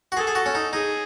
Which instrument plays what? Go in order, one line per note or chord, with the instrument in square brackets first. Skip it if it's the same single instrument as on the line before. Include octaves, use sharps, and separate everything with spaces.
[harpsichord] F#4
[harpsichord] G#4 [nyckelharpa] A4
[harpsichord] G#4
F#4
C#4
D#4
[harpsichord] D#4 [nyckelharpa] G#4